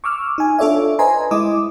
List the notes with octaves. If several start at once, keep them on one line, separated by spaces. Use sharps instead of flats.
C#6 D6 E6 F6
D#4 G#5
D4 F4 A4 C#5 D5 E5
B4 C5 D#5 G#5 A#5 C6
G#3 E4 D#5 D6 D#6